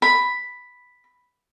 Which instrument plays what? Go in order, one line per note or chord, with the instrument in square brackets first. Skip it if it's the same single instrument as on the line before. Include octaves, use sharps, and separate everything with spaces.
[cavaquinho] B5